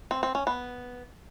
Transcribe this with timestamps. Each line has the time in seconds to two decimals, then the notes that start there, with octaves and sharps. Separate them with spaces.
0.11 C4
0.23 C4
0.35 C#4
0.47 B3